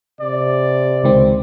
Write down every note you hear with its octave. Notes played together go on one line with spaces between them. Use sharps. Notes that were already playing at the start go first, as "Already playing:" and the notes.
C3 D5
C#2 D#3 C4